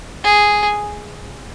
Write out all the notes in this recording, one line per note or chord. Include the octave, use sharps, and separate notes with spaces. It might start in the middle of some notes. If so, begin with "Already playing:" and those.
G#4